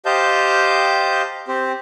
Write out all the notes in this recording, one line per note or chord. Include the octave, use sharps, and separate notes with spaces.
G4 C5 D#5 F5 A5 G6
C4 G4 C5